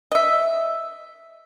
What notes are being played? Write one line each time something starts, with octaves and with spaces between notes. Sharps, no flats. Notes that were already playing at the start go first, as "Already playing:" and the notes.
D#5 E5